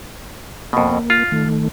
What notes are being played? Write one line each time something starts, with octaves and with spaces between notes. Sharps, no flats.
F2 B2 A#3
F4
D#3 A3